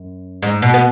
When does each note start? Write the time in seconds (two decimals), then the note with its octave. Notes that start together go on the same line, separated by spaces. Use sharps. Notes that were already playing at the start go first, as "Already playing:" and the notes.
Already playing: F#2
0.42 G#2
0.62 B2
0.74 B3